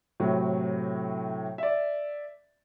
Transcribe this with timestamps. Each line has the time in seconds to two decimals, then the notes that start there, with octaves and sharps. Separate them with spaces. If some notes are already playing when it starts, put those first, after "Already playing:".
0.20 A2 C3 F#3
1.58 D5 E5